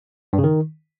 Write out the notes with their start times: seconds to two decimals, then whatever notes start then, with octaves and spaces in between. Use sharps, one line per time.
0.33 G2
0.38 C#3
0.44 D#3